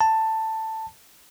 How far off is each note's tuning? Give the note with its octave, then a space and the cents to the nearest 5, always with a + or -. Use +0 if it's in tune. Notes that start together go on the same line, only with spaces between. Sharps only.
A5 +10